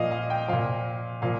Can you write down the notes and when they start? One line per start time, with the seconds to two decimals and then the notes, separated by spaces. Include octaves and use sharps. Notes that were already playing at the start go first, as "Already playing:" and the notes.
Already playing: A#2 F3 D#5 F5
0.11 F5
0.30 G5
0.48 A#2 F3 F5
1.22 A#2 F3 F5